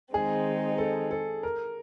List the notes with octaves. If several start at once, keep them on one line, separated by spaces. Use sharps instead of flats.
D#3 G#3 C4 D#4 G#4
A4
A4
A#4